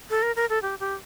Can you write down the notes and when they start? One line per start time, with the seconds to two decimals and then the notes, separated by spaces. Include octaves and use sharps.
0.10 A4
0.22 A#4
0.36 A#4
0.50 A4
0.63 G4
0.80 G4